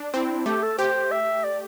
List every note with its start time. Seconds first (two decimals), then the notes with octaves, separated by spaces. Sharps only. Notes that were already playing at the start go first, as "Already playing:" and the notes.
Already playing: D4
0.13 C4 E4
0.46 A3 G4
0.62 A4
0.78 G4 C5
1.11 E5
1.44 D5